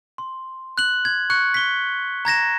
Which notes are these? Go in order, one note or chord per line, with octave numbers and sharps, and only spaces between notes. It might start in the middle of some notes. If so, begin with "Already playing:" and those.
C6
F#6 F#7
G#6
C#6 F#6 C#7
B6 G7
A#5 G#6 A#6 E7